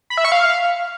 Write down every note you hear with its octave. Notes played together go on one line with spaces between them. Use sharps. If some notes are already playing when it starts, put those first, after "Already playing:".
B5
E5
C#6
F5